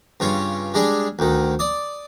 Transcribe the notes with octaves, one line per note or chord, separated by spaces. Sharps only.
G2 C#3 F4 C#5
G3 G#3 D4 G#4
D2 D#3
D5 D#6